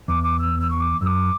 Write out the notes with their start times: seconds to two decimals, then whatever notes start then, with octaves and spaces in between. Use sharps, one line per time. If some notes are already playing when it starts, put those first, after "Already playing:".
0.08 E2 D6
0.23 D6
0.39 E6
0.60 E6
0.70 C#6
0.80 D6
1.01 F#2 E6
1.06 D6